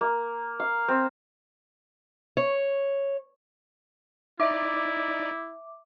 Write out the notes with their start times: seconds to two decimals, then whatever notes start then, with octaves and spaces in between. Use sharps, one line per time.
0.01 A#3
0.60 F5
0.88 C4
2.37 C#5
4.40 D#4 E4 D5 E5 D6